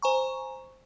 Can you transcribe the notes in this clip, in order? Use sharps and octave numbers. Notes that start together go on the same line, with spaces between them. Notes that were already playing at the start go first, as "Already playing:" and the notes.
C5 G#5 A#5 C#6